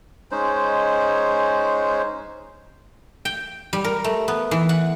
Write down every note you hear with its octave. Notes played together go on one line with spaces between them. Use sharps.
G#3 C#4 D#4 C5
G5
G3
A#4
A3
B3
E3
F#5